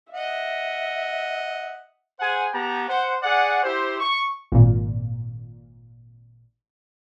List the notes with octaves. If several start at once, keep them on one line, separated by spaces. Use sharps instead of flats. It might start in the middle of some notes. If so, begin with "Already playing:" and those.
D#5 E5 F#5
G#4 C5 F#5 G#5
B3 G4 G5 A5 A#5
C5 F#5
G#4 D5 F#5
E4 G4 C5
C#6
G#1 A#2